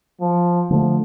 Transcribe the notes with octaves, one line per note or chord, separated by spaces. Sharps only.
F3
D3 F3 A3